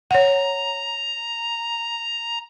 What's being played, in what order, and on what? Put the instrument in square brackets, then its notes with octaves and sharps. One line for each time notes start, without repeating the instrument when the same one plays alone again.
[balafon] C#5 F#5 [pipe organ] A#5